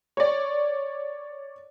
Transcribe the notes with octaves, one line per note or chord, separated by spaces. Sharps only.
C#5 D5